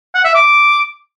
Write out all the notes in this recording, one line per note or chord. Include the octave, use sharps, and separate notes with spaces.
F#5
E5
D6